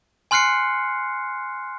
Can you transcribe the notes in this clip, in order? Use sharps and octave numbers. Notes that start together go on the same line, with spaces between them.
G#5 C6 F6 F#6 C7 C#7